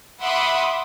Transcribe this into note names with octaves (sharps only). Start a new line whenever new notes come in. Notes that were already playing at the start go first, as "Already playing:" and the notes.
E5 F#5 B5 C6 D6 D#6